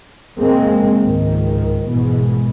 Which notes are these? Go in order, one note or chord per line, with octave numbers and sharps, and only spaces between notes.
C#3 G#3 A#3 C4
C#2 G#2 D#3
G#1 B2 E3 G#3